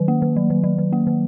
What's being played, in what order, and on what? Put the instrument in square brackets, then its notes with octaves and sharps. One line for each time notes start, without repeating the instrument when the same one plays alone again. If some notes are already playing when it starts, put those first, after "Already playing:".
Already playing: [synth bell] D#3 F#3
A#3
D#3
F#3
D#3
F#3
D#3
A#3
D#3